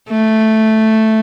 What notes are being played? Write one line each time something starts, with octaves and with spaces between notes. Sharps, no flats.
A3